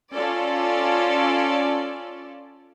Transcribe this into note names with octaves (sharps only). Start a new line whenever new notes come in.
C#4 F4 A4 D5